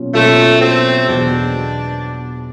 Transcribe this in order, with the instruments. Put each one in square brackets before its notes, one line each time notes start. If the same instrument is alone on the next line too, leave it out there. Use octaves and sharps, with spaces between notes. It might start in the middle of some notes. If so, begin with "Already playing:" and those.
Already playing: [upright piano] B2 F#3 A#3 C#4 F4
[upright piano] B2 F#3 A#3 C#4 F4 [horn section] A3
[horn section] C4
[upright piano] E2 B2 F#3 [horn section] D4